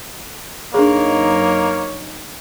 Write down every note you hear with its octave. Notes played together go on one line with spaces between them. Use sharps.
F#2 A#3 D4 D#4 G#4 C#5